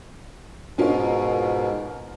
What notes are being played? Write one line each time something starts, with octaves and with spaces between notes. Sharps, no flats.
G#2 B2 C#4 F4 A#4